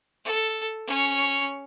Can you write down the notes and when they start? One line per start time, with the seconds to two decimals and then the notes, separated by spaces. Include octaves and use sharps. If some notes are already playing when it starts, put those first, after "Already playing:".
0.25 A4
0.87 C#4 C#5